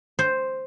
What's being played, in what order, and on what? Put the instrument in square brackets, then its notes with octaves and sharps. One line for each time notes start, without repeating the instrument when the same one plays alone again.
[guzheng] C5